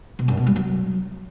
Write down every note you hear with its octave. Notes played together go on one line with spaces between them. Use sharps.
B2
F#2
B2
G3
F#3